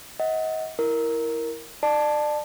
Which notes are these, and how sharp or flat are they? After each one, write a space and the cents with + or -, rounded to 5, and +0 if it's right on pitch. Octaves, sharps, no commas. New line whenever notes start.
D#5 +35 F#5 +0
E4 +0 A#4 +0
D5 +30 A5 +0